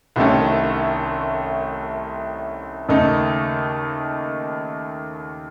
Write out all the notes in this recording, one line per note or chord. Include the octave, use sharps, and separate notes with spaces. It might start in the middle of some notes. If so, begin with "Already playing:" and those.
C2 C3 D#3 A3 C#4
D#2 C#3 A3 D#4